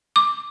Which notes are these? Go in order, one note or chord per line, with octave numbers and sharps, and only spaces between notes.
D6